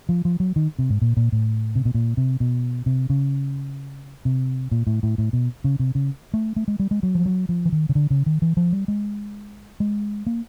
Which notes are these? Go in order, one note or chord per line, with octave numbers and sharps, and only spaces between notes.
F3
F3
F#3
D#3
C3
G#2
A#2
A#2
A2
C3
B2
A#2
C3
B2
C3
C#3
C3
A#2
A2
A2
A2
B2
C#3
C3
C#3
A3
A3
G#3
G3
G#3
F#3
F3
F#3
F3
E3
D#3
C#3
D3
C#3
D#3
E3
F3
G3
G#3
G#3
A#3